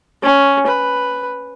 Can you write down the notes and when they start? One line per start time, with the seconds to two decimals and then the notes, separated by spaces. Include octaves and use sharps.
0.23 C#4
0.67 B4